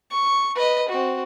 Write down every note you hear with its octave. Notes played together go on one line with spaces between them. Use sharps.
C#6
B4 D#5
C4 F#4